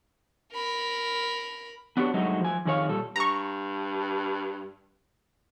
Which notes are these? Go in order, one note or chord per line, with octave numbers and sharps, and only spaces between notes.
A#4 B5
B3 D4 F#4 G4 C5 C#5
G2 F#3 G#3 A3 D#4 F#4
F3 G#5
F2 D#3 G#4 C#5 F5
A#2 G3 A4
G2 A#5 C#6